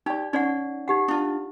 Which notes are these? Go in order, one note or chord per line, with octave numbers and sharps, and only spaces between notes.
D#4 G4 D5
C#4 D#4 D5 F#5
D#4 G4 F#5
D4 F4